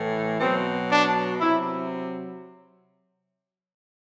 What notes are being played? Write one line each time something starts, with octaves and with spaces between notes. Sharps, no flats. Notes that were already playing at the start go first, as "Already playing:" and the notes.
Already playing: A2 E3
B2 F#3 C4
D4
C3 F#3 E4